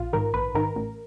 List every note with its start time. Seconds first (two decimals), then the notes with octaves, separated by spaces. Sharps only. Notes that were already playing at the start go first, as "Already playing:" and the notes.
Already playing: A#1 F4
0.13 G#2 D#3 A#4
0.34 A#1 B4
0.55 G#2 D#3 A#4
0.76 A1